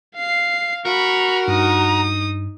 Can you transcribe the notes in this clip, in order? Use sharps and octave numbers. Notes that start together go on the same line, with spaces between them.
F5 C7
F#4 A#4 B5 C#6
G2 D#4 D#6